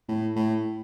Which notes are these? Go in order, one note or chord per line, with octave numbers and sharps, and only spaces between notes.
A2
A2